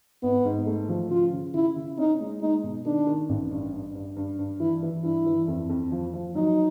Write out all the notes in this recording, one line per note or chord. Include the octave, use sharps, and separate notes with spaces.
G#1 B3
G#2
A3
F3
C#3 F4
C#3
C#3 E4
C#3
C#4 D#4
G#3
G#3 D#4
B2
D#3 D4
D#3
A1
G2
G2
G2
G2
G2
E3 E4
E3
G2 E4
E3
F2
F2
F3
F3
F#3 D#4